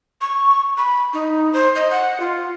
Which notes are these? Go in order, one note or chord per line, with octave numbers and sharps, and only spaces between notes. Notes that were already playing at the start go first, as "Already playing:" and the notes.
C#6
B5
D#4
C5
D#5
F#5
F4